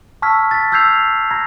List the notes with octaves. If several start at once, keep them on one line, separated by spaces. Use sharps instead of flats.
A5 C#6 E6 F6 G#6 B6
A6 B6
E6 F6 G6 G#6 C7 F7
A#5 G#6 A#6